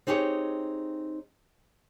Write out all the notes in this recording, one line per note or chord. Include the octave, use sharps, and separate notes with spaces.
C4 D#4 G4 G#4 C#5 D#5